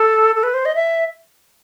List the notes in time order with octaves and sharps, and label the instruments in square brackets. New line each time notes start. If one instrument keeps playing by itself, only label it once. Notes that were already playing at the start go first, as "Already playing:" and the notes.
Already playing: [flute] A4
A4
B4
C5
D#5
E5